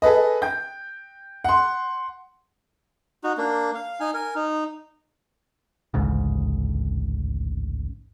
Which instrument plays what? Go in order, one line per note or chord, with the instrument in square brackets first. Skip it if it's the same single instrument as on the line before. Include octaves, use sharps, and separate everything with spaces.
[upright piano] G#4 A4 B4 D#5
G5 G6
F#5 C6
[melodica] D#4 F#4
A#3 D4
F5
D#4 G#5
A#4 G#5
D#4
[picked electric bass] A1 D2 G#2 C#3